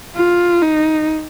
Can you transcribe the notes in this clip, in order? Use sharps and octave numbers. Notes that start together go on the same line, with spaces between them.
F4
D#4